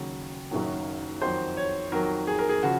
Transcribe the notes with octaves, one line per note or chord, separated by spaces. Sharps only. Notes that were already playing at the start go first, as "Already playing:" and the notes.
Already playing: D#2 C#3 F#3
F#1 F#2 D#3 F#3
F2 D#3 F#3 C5
C#5
F2 D#3 F#3 A#4
G#4
A#4
G#4
C#3 F3 F#4